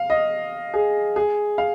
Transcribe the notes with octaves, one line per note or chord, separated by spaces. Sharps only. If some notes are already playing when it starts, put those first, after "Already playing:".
Already playing: F5
D#5
G#4
G#4
F5